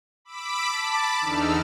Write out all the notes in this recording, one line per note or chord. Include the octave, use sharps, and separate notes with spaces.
B5 D6 E6 B6 D7
A5 B5 D6
E2 D3 D#4 E6 F6